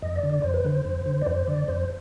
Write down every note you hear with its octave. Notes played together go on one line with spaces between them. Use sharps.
F2 D#5
D5
D3
D5
F2 C5
B4
D3 C5
F2
D3
D5
F2 C5
D3 D5
F2 C5